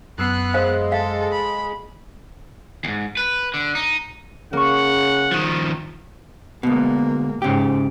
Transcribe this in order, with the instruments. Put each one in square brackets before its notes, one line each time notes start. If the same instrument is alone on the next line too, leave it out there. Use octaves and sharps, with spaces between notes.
[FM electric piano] F#2 E6 C7 [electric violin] B3 F#6
[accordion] G#3 [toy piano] A#4 C5 F5
[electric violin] A4 [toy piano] F5
[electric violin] B5
[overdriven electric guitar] D#2 G#2
B4
D3
D#4
[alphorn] C#3 [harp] A#3 C#6 [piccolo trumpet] F#5
[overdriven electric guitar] D#3 F3
[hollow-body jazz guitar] D2 B2 [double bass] G#3 A#3
[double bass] G#2 [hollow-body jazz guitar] C#3 G4